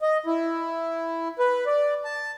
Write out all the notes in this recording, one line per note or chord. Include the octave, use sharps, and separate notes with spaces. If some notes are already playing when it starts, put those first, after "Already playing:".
D#5
E4
B4
D5
A5